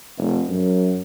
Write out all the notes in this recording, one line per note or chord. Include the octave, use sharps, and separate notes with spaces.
F1
F#2